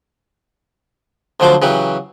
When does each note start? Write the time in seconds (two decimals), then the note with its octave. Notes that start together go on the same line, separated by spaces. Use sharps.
1.40 D2 D3 F3 F#3 C5 D6
1.62 C#3 E3 F#3 G4